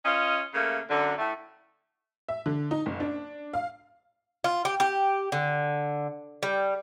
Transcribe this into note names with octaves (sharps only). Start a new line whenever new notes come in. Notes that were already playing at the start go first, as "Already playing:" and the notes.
C#4 F4 D#5
C#3 A3 A#3
F#2 D3
A2 A3
E5
D3
D#4
F#1
D4
F5
F4
G4
G4
D3
G3